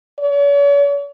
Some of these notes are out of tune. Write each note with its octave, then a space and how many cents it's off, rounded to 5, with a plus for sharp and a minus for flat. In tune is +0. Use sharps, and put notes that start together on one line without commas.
C#5 +45